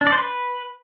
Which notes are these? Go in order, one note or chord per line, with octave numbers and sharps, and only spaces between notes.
D4
D5
C5
B4